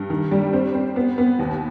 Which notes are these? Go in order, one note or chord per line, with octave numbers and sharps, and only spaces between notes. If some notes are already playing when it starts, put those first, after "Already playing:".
Already playing: G2
D#3
G3
C4
C4
B3
B3
D#2